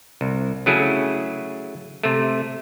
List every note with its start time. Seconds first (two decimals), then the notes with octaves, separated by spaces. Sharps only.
0.21 C2
0.66 C#3 F#3 A3 E4 G#4
2.04 C3 A3